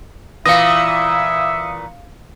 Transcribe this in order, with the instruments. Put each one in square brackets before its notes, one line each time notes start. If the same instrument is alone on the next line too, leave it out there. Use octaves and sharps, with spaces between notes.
[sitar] A#2 E3 [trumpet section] E4 E5 [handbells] F5 A#6 [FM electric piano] D#6 C#7